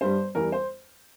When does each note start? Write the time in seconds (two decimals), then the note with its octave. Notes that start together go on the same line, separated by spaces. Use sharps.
0.01 G2 G3 C5
0.35 E2 E3 G3 A#4
0.52 C5